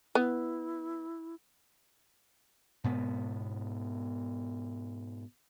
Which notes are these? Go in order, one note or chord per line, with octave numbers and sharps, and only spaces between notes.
B3 E4
G#2 B2 B3